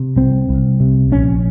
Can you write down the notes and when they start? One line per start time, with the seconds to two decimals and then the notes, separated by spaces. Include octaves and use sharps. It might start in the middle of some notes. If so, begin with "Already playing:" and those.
Already playing: C3
0.16 C2 C4
0.49 C2
0.80 C3
1.12 A#1 C#4